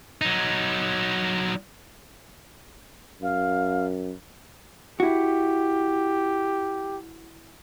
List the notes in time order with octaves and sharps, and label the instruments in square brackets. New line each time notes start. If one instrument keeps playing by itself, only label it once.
[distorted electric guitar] F#3 D#4
[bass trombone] F#2 [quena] F5
[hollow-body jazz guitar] E4 F#4 [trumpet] G4